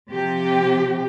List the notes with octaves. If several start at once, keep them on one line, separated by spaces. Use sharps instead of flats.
C3 F3 G4